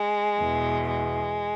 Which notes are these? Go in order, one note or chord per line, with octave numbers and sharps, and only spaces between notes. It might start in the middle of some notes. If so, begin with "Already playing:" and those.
Already playing: G#3
E2 B2
G#3